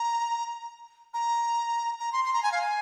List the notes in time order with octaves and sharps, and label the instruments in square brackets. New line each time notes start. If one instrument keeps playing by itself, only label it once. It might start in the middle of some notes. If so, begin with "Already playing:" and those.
Already playing: [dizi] A#5
A#5
A#5
C6
C6
A#5
G#5
F5
G#5